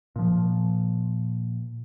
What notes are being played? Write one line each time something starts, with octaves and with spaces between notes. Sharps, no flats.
A#2 F3